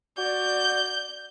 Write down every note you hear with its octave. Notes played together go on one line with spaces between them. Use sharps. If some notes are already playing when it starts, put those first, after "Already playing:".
F#4 D5 G6